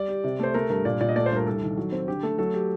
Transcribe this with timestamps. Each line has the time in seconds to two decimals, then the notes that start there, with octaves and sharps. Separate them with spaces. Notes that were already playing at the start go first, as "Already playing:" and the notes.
Already playing: G3 D5
0.09 G4
0.24 C3
0.39 A3 C5
0.54 A3 A#4
0.70 G2 A#4
0.85 A#2 D5
1.01 A#2 D5
1.09 D#5
1.16 A3 D5
1.26 C5
1.31 G2
1.37 A#4
1.47 C2 A4
1.62 D#3
1.77 F#3
1.92 C4
2.08 D3 G4
2.23 A3 A4
2.38 F#3 A4
2.54 G4